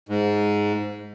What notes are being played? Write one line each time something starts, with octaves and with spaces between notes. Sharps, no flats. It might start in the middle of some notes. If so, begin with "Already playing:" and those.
G#2